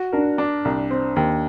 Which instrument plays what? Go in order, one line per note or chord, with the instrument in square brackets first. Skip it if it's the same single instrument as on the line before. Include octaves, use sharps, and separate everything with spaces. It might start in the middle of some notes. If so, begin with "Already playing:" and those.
Already playing: [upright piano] F#4
[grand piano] D4 [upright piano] A#4
[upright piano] D4
C2
C4
D#2